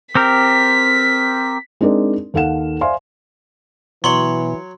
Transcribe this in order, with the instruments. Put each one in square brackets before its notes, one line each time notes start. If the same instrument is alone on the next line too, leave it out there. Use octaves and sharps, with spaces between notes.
[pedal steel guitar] C4 G4 A#4 [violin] B6
[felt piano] G#3 C4 D4 D#4 A#4 D5
D#2 A4 F5 F#5 E7
C5 D5 E5 F5 G#5 C6
[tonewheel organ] B2 [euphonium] E3 [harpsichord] F#3 C#5 [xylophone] C6 F#7